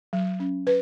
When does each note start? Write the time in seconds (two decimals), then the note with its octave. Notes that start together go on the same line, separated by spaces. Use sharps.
0.13 F#3
0.40 C#4
0.67 B4